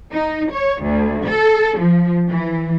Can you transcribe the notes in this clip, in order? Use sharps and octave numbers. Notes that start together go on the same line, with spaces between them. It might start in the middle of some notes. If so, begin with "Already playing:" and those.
D#4
C#5
D2
A4
F3
E3